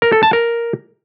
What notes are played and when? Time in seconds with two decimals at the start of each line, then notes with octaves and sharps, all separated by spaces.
0.02 A#4
0.12 A4
0.23 A5
0.33 A#4